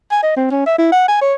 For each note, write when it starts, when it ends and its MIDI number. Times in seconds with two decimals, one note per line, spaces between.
0.11 0.19 80
0.23 0.32 75
0.37 0.49 60
0.51 0.64 61
0.66 0.77 76
0.78 0.87 64
0.92 1.04 78
1.08 1.17 80
1.21 1.34 73